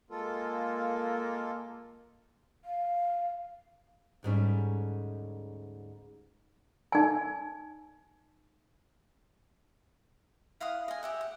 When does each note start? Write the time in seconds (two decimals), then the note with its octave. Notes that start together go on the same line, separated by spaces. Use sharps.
0.10 G#3 A#3 F4 A4
2.65 F5
4.23 D2 G#2 G3 C#4
6.92 D#4 G#5
10.60 E4 F5 F#5 D#6
10.88 D#5 G#5
11.03 G4 E5 F#5
11.21 F#5